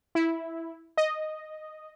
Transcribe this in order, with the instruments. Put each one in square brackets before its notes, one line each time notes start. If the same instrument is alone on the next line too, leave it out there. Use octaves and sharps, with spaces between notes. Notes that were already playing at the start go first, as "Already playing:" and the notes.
[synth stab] E4
D#5